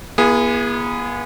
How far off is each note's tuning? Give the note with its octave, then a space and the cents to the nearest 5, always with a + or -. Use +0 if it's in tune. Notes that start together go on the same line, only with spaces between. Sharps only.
B3 -40 E4 +35 G#4 -10